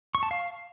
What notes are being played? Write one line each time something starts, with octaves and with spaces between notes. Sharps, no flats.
C#6
A5
F5